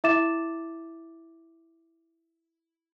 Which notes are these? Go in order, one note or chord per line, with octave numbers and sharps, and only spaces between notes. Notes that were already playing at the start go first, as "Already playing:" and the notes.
E4 E5 D6 A6 E7